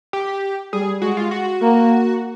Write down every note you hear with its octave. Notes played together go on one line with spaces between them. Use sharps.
G4
G3 G#4
G#3 F#4
F4
F#4
A#3